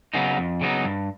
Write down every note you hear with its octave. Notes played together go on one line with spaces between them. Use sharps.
C#3 F#3 B3 D#4
F2
C#3 F#3 B3 D#4
G2